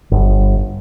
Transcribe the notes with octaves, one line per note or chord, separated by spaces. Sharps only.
G1